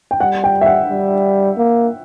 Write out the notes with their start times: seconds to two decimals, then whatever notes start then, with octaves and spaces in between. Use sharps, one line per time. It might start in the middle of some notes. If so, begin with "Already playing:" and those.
0.11 G5
0.20 G3 F#5
0.44 G5
0.61 E5
0.66 F#5
0.89 G3
1.58 A#3